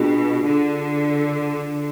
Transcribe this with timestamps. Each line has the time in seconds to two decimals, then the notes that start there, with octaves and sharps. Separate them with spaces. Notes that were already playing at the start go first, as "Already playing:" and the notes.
Already playing: B2 D4 F4 G#4
0.45 D3